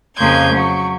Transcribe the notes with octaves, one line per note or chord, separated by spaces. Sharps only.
F2 C#3 A#3 C6 G6 G#6
F#3 C#6